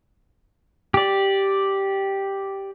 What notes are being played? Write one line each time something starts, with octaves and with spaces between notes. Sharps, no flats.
G4 D5